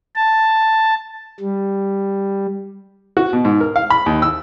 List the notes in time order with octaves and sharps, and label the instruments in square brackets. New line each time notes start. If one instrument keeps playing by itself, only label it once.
[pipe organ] A5
G3
[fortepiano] F#4
B2
G#2
A#4
F5
B5
D#2
E6